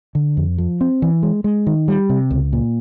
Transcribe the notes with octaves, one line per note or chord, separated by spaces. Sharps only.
D3
F2
F3
C4
E3
G#3
G#3
D#3
G3
C3
C#2
A#2